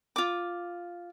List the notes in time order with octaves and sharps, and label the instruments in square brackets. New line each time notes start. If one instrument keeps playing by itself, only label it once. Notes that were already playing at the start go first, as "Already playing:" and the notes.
[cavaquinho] F4 D6